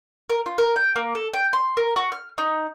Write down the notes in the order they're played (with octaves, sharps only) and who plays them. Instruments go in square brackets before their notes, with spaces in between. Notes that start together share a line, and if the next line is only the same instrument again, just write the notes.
[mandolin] A#4
F4
A#4
G5
A#3
A4
G5
C6
A#4
F#4
F6
D#4